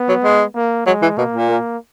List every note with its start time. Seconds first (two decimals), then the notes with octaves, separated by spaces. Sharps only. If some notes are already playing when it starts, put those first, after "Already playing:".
Already playing: B3
0.09 F#3
0.24 G#3
0.55 A#3
0.86 F#3 G#3
1.02 E3
1.17 B2 A#3
1.34 A#2
1.49 A#3